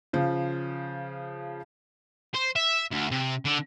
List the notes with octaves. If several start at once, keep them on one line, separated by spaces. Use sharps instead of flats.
C#3 F3
C5
E5
D2
C3
D3